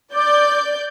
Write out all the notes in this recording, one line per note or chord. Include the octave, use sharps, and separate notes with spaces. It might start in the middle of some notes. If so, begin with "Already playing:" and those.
D5 D6 G6